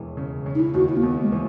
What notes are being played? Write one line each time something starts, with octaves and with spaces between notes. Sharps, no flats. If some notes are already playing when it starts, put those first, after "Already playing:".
Already playing: E1 D#2 E3
C#3
C#3
D#4
E4
D#2 F#4
E4
A#3
D#2 B3
G#3
E3